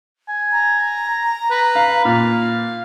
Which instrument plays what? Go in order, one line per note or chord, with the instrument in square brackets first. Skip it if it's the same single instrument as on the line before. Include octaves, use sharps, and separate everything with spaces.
[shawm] G#5
[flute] A#5
[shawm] B4
[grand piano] F5
[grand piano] A#2 [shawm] F5